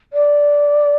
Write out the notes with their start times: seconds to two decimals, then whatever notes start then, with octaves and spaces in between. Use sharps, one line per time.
0.13 D5